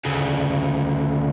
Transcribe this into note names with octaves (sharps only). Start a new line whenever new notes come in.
D2 C#3